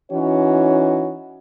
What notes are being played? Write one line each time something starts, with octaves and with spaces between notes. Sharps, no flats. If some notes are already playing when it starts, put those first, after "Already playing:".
E3 C#4 D#4 F#4 C#5